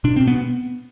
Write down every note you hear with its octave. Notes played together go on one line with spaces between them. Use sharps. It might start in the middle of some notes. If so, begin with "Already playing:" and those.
B2 D4
B2 C4
B3